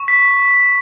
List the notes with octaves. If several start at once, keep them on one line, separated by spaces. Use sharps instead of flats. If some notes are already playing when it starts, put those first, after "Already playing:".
Already playing: C#6
B6